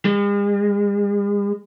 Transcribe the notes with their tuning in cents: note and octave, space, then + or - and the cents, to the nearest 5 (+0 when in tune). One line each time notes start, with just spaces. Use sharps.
G#3 -45